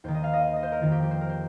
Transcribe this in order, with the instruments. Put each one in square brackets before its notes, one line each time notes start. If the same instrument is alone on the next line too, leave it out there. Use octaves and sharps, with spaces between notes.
[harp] D#2 D#3 C5
D#5
F5
D#5
F5
D#5
C5
A#4
F2 D#3 F4
G4
G4
C5
A#4
C5